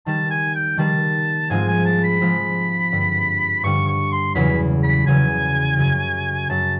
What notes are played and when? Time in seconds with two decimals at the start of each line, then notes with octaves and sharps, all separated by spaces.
0.06 D#3 G3 A#3 A5
0.30 G#5
0.55 G5
0.77 D#3 G3 A#3 A5
1.50 G#2 F3 G#3 C4 F4 G#5
1.68 G#5
1.85 A5
2.04 B5
2.21 G#2 F3 G#3 C4 F4
2.92 G2 D3 G3
3.63 G2 D3 G3 C#6
3.88 C#6
4.12 C6
4.35 E2 C#3 F#3 B5
4.83 B5
5.06 E2 C#3 F#3 G#5
5.78 F#2 C#3 F#3
6.49 F#2 C#3 F#3 A5